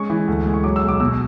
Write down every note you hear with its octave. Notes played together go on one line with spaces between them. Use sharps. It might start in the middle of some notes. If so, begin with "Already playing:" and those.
Already playing: G#3 C#4 C#6
E3
D2
G#3
C#6
F#3 D6
E6
B1
D6
B2 E6